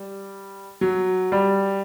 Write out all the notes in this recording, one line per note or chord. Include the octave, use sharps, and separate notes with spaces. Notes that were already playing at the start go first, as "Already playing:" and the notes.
Already playing: G3
F#3
G3